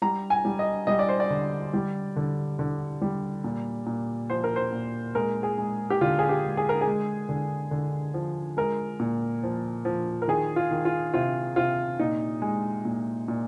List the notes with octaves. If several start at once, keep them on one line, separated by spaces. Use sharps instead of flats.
G3 A#5
G#5
G3
D#5
G3 D#5
D5
C5
D5
D3
G3
D3
D3
G3
A#2
A#2
F3 C5
A#4
C5
A#2
G#3 A#4
G#4
G#3
G4
D3 F4
G#4
G4
G#3
G#4
A#4
G#4
G#3
D3
D3
F3
G#3 A#4
A#2
F3
F3
A#4
D#3 G#4
F4
D#3
F4
C3 F4
C3 F4
A#2 D#4
G#3
A#2
A#2